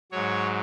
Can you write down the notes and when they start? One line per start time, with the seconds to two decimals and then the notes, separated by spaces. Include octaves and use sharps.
0.12 G#2 F#3 C#5